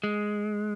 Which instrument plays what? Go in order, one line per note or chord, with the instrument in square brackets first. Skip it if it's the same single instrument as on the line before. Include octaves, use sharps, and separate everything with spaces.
[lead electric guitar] G#3